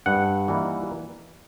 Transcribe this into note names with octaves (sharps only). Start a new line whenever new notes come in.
G2 F#5
E3 G3 A#3 D#4